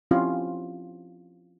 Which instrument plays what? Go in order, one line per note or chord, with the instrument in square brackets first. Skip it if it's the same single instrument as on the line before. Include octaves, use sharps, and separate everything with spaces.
[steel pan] F3 C4 C#4 E4 F4 G4